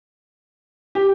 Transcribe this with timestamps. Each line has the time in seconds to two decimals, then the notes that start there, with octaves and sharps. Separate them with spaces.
0.95 G4